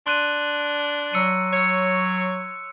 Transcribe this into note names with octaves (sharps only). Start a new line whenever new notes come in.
D4 C6 F#6 D#7
F#3 E6 C#7 D#7
C#5 E6 C#7